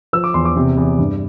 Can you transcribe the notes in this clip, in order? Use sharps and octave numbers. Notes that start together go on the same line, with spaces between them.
F3 E6
D6
E2 C6
D6
C3
E2
G2